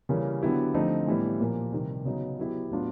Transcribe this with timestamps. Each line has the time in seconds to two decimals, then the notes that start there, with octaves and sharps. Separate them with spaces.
0.09 C#3 E3 G3 A#3 C#4
0.42 D3 F#3 B3 E4 G4
0.74 D3 F3 A3 C4 D#4
1.07 A2 E3 G3 B3 E4
1.40 A#2 F3 A#3
1.72 C3 D#3 G3
2.05 C#3 F#3 B3 D#4
2.38 F#3 B3 E4 G4
2.70 A2 F#3 B3 D4 F4